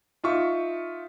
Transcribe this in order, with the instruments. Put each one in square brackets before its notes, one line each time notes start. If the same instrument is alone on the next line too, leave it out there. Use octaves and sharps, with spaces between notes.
[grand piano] D#4 F4 E5 C#6